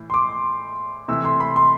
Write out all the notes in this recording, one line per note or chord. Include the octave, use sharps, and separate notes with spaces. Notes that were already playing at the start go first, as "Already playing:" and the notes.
Already playing: A2 E3
C6
D6
C3 E3 A3 E6
C6
B5
C6